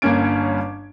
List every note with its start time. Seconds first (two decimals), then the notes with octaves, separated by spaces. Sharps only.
0.02 G1 G2 A#3 C#4 G#6 D7